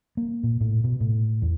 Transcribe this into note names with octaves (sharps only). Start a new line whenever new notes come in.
A#3
A#2
A2
B2
A2
E2